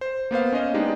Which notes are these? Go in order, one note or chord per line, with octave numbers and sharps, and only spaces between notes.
C5
A#3 B3 C5 F5
C#4 C5 D#5 F5
G#3 B3 D4 D#4 G4